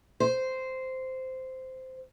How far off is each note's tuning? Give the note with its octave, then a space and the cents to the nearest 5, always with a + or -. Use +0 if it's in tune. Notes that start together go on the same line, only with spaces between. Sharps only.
C5 -10